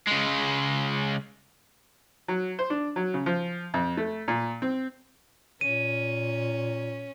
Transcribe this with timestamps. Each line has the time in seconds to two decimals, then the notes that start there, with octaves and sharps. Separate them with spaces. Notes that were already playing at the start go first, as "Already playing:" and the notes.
0.07 C#3 G#3
2.28 F#3
2.59 C5
2.70 D4
2.96 F#3
3.14 C#3
3.26 F3
3.74 F2
3.97 A3
4.28 A#2
4.62 C4
5.61 A#2 C#4 D#7